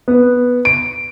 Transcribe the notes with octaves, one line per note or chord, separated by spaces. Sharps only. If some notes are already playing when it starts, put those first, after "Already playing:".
B3
D7